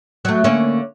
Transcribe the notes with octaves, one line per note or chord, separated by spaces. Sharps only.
F#3 A3
D3 A#3 C#4